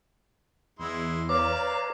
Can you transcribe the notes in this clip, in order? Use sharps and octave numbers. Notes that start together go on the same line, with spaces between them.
E2 G#3 E4 C6
B4 C#5 D5 F5 A#5 D6